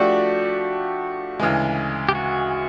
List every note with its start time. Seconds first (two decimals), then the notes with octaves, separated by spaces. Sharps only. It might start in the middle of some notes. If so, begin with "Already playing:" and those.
Already playing: F3 A3 D4 F#4 G4
1.40 D2 C#3 E3 G#3
2.09 G4
2.15 F#4